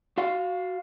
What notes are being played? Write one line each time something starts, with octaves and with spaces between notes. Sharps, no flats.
F#4 F5